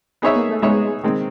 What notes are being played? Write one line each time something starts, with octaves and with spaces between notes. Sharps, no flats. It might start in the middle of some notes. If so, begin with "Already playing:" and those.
B3 D#4 G#4 C#5 E5
A#3
A3
G#3 B3 D#4 G#4 C#5 E5
D#3 G#3 C4